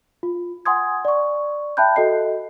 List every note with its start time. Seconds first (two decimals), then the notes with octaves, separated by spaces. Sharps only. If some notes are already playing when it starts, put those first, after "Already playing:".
0.23 F4
0.66 F#5 G#5 C6 D#6 G#6
1.05 D5 C#6
1.77 E5 G5 A5 B5 F#6 G6
1.96 F#4 A4 D#5 C7